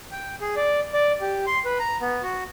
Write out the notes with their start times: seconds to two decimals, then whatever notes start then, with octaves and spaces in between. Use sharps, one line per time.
0.12 G5
0.41 G#4
0.56 D5
0.93 D5
1.21 G4
1.47 C6
1.65 B4
1.79 A#5
2.01 B3
2.23 F#4